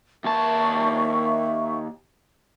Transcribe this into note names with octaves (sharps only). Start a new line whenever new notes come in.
D#2 A#4 E5 A5 C#6